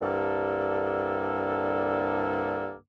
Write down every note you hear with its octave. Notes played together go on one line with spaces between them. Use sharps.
C2 G2 D3 A#3 A4